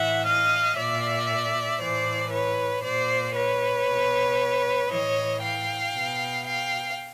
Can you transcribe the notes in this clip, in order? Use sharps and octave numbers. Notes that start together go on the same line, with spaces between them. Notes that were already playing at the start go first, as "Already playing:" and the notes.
Already playing: A2 E3 E5 F#5
D#5 F5
A#2 D5 E5
A2 E3 C5 D5
B4 C#5
A#2 C5 D5
B4 C#5
B2
A2 E3 C#5 D#5
F5 G5
B2
F5 G5